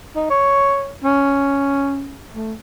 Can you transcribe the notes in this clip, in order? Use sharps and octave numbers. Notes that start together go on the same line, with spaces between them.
D#4
C#5
C#4
A3